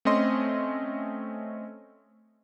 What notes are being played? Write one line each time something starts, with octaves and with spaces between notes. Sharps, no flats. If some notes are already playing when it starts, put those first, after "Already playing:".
A3 C4 C#4 D#5 C6